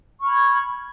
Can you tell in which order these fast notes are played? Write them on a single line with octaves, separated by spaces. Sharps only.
C#6 F6 B5 G#6